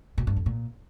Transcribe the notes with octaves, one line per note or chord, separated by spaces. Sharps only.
A#2
G2
F2
A#2